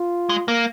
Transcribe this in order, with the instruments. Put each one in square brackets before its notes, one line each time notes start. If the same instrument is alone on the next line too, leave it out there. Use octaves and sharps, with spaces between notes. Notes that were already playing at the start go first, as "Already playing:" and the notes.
Already playing: [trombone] F4
[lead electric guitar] G#3
A#3